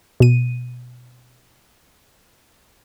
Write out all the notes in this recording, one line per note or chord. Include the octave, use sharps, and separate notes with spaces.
B2 D#7